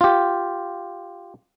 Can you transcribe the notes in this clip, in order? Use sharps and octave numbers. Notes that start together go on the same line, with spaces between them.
F4 G4